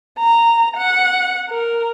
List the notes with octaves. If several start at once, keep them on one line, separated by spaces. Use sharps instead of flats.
A#5
F#5
A#4